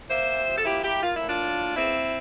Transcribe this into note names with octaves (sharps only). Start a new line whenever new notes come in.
A#3 C5 E5
C3
F3
A4
A#3 E4 G4
A#3 E4 G4
A#3 F4
E4
A2
D4 F4
A2
A#3
E2 C4 E4